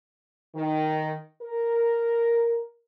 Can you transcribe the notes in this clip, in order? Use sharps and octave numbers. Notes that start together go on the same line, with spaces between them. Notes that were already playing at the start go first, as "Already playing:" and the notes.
D#3
A#4